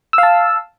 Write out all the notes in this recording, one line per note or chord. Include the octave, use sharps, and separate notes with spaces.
F5 A5 E6